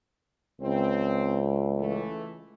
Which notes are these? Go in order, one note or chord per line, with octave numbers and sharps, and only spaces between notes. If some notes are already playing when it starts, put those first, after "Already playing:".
C#2 C4
E3 A3